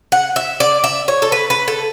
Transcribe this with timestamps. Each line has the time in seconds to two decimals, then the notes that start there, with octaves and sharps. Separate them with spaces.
0.12 F#5
0.36 E5
0.60 D5
0.84 E5
1.08 C#5
1.22 A4
1.32 B4
1.50 B4
1.68 A4